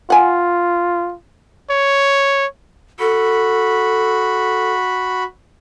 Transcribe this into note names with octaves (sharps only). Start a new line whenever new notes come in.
F4 F#5 G#5
C#5
F#4 A4 B5